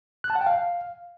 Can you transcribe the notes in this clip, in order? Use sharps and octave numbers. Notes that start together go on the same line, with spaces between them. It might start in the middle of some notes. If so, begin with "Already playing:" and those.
F#6
A5
F#5
G5
F5